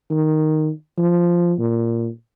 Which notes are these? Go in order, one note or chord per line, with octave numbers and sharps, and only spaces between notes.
D#3
F3
A#2